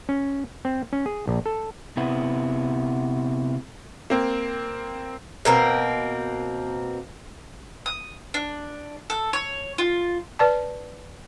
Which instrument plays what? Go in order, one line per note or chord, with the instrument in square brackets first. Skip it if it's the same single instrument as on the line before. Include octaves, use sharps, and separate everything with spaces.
[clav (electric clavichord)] C#4
C4
C#4
G#4
A#1
A4
[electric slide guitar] C3 B3 E4
[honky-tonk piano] A#3 C4
[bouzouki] B2 A#3 C4
[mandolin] D#6
D4
A4
C#5
F4
[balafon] B4 D5 A5